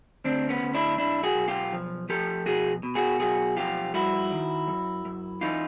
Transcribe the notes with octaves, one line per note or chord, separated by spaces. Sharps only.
D2 C4 D4
B3 C#4
D2
D4 E4
B1 D4 E4
F#4 G#4
B1
F4 G4
F3
F3 G4 A4
B2 F#4 G#4
B2
F#4 G#4
B1 F#4 G#4
F3 F4 G4
G2 E4 F#4
D#3
F#2
F#2
E3 D#4 F4